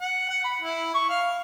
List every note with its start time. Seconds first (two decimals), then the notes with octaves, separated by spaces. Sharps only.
0.01 F#5
0.29 F#5
0.44 B5
0.62 E4
0.94 C#6
1.10 F5